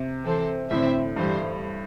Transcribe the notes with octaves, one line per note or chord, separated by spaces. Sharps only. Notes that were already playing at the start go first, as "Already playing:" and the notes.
Already playing: C3
E3 C4 A4 C5
A2 D3 C4 E4 C5 E5
G2 E3 G3 E4 C5